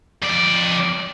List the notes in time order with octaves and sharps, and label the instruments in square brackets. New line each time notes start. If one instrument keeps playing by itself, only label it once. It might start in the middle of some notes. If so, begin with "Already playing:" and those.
[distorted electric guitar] F2 D5